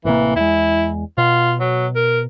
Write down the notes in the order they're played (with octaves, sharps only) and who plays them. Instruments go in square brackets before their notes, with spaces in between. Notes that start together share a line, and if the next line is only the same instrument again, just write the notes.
[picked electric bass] A1 C3 A#3 [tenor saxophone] E3
[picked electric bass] E2 G#3 [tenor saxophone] E4
[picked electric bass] B2 [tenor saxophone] F4
[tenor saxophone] F#3
A#4